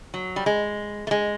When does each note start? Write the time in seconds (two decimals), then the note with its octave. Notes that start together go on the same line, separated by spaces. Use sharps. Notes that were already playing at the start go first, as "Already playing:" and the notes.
0.14 F#3
0.36 G3
0.46 G#3
1.07 A3
1.11 G#3